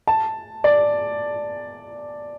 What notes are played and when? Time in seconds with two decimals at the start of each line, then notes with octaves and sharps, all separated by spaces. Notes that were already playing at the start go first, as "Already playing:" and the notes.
0.07 A5
0.64 D5